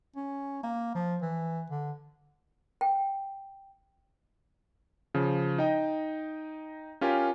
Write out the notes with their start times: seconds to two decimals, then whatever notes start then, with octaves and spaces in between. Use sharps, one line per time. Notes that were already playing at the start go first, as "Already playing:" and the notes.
0.16 C#4
0.63 A#3
0.95 F3
1.22 E3
1.70 D3
2.81 G5
5.14 C#3 F3
5.58 D#4 D#5 G5
7.01 C#4 F4 G4 A#4 G#5